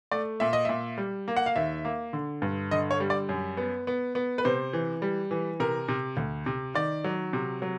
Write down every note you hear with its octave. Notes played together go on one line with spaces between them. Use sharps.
A3 D5
A#2 E5
D#5
A#2 E5
G3
A#3
F#5
F5
D#2 E5
A#3
D3
G2
D3 D#5
C#5
G3
D5
F#2
B3
B3
B3
B4
C3 C5
E3
G3
E3
C3 A#4
C3
D2
C3
D#3 D5
F#3
C3
F#3